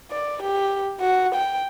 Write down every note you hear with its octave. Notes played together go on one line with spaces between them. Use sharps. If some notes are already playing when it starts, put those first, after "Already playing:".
D5
G4
F#4
G5